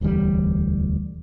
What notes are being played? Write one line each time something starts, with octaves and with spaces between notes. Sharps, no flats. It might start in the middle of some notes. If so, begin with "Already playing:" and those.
E1 D2 E3 G3